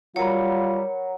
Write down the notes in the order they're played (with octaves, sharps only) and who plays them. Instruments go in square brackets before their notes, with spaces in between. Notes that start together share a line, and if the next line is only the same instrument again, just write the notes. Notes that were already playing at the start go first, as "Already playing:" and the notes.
[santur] F#3 A#4 B5 [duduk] G3 [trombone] F4 [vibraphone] C#5